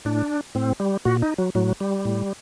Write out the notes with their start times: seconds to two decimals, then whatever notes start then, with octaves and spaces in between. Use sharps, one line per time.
0.05 A2 D4
0.55 A2 C4
0.80 G3
1.05 A#2 F#4
1.22 D#4
1.38 F#3
1.55 A2 F#3
1.80 G3
2.05 A2